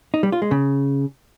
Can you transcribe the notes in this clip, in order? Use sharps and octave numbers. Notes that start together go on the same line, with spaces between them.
D#4
G3
F4
G#3
C#3